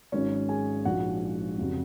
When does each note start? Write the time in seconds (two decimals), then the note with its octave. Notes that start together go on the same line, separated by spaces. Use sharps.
0.12 G#1 G#2 D#3 F#3 C#4 C#5
0.49 G#4 G#5
0.85 A#1 G#2 F3 F#4 F#5
1.58 F1 F2 C#3 F#3